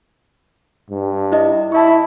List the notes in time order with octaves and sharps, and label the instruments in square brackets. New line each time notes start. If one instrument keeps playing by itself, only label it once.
[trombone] G2
[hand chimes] E4 D#5
[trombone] E4 [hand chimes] A5 C#6